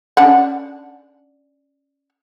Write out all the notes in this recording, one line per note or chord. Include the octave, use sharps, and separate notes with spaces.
C#4 D4 F#5